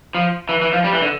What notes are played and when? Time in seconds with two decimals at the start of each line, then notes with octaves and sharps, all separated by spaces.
0.15 F3
0.49 E3
0.62 E3
0.73 F3
0.84 G3
0.93 E3
1.02 D3